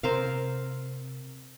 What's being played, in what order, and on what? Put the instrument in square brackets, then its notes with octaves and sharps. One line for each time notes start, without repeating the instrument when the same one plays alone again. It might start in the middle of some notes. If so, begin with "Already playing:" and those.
[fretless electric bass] C3 [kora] C4 A#4 F5